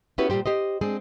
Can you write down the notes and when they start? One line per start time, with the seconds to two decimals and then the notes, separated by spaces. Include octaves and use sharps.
0.18 B3 C#4 E4 F#4 G4 B4
0.30 A#2 G3 G4 C5
0.46 G4 C5 D#5
0.81 G#3 C4 D4 G#4